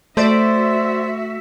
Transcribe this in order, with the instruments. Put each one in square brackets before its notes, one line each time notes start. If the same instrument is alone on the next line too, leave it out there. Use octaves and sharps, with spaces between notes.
[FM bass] A3 [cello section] F#4 E5 [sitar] C5 D5